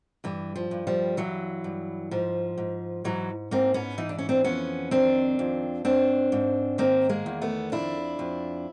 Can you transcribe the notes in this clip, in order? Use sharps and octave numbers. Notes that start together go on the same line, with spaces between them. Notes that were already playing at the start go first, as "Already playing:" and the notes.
G2 E3
F3
G2
F3 G3
G2 E3 F#3
G2
G#2 F3
G#2
G#2 E3 F#3
G#2 A#3 C4
B3 C#4
E3 D#4
D4
C#4
C4 D4
F2 B3 C#4
D#3 C4 D4
F2
G#2 C4 D4
G#2
D#3 A#3 C4
G#3 A#3
E2
A3 B3
F2 D4 E4
F2